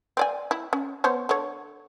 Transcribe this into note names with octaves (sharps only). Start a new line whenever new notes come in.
C4 D5 G#5
E4
C#4
B3 C5 C#5
D3 C#5